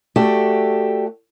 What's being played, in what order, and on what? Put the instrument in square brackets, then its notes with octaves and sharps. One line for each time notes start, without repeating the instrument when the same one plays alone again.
[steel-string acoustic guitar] A3 F#4 G4 A4 D5